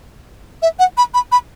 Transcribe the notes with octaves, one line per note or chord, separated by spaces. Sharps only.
E5
F#5
B5
B5
B5